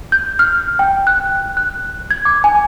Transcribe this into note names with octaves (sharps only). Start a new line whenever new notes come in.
G6
F6
G5
F#6
F#6
G#6
D6
G#5